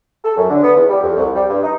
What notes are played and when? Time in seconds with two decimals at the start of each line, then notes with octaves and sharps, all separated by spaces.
0.25 A4
0.37 F#2
0.50 D3
0.63 B3
0.76 E2
0.89 G3
1.03 F2
1.17 C2
1.35 G3
1.49 G2
1.63 D#4